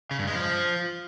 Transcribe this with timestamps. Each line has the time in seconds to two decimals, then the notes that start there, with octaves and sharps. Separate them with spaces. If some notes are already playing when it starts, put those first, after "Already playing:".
0.11 C#3
0.19 G2
0.27 G#3
0.35 F3